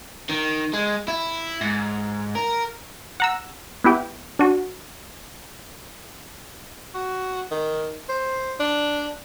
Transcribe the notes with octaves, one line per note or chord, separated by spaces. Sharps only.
D#3
G#3
E4
G#2
A#4
F#5 A#5 E6
B3 E4 G4 G5
D4 F#4
F#4
D#3
C5
D4